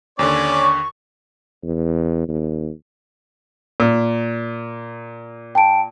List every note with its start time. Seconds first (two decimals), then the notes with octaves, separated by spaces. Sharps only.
0.19 D#2 D3 C#4 C#5 D5
0.61 C#6
1.63 E2
2.29 D#2
3.80 A#2
5.55 G5 A5 D7